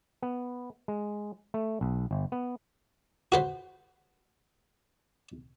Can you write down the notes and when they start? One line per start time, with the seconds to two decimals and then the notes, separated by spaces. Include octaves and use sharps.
0.23 B3
0.88 G#3
1.54 A3
1.81 B1
2.11 G1
2.32 B3
3.32 F#4 B4 C5